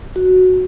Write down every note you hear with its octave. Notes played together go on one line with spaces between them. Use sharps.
F#4